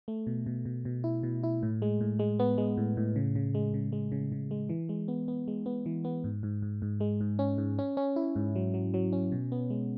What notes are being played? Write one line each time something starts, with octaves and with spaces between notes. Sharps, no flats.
A3
B2
B2
B2
B2
E4
B2
E4
A2
G#3
A2
G#3
B3
G#3
A2
A2
C#3
C#3
G#3
C#3
G#3
C#3
C#3
G#3
E3
G#3
B3
B3
G#3
B3
E3
B3
G#2
G#2
G#2
G#2
G#3
G#2
C#4
G#2
C#4
C#4
E4
G#2
F#3
F#3
F#3
C#4
B2
B3
G#3